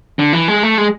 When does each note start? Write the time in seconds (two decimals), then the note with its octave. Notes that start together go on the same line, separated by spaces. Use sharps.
0.19 D3
0.33 E3
0.48 G#3
0.63 A3
0.78 G#3